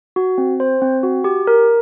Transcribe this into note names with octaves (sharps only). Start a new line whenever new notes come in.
F#4
C4
C5
C4
F#4
G4
A#4